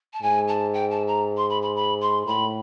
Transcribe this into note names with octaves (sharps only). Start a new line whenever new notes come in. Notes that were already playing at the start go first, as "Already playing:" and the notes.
A5
G#2 G#5
A5
G5
A5
A#5
C6
B5
B5
B5
C6
A2 B5